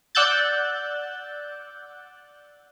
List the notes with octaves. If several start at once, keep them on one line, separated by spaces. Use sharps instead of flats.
D5 F#5 E6 F#6 G6 A6